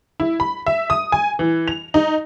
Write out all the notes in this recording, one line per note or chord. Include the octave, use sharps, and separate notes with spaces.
E4
B5
E5
D#6
G#5
E3
F7
D#4